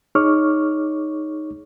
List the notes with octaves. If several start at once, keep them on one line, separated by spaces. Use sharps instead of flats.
D#4 G#4 C#5 C#6 D6 F6